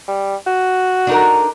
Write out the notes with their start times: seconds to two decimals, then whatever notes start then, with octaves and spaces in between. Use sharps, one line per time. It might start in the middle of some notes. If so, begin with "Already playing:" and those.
0.08 G3
0.47 F#4
1.07 D4 D#4 A#4